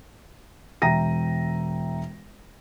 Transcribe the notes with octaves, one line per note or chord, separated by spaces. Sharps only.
E1 E5 G5 A#5 A#6 D#7